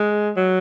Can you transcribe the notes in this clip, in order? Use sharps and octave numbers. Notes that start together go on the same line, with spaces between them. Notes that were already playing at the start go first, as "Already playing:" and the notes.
Already playing: G#3
F#3